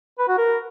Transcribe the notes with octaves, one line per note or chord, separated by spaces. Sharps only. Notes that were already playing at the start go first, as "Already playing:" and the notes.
B4
F#4
A#4